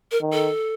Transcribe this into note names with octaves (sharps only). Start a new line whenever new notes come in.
A#4
D#3
A4